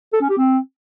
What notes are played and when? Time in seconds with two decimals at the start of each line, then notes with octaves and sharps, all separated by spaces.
0.13 A4
0.21 C#4
0.29 G4
0.38 C4